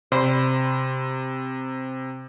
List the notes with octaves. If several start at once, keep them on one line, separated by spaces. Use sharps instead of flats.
C3 C5 B5